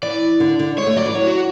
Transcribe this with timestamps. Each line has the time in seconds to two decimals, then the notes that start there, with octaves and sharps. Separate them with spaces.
0.02 E3 D5
0.40 D3
0.59 D3
0.77 G#3 C#5
0.87 A3
0.96 F#3 D5
1.06 E3
1.15 F#3 C#5
1.27 F#4